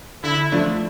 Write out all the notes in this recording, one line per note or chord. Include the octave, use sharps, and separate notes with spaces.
D3 E4
F3 A3 D4